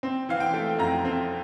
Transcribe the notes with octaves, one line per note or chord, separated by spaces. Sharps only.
C4
E3 F5
G5
A3
F2 A#5
C4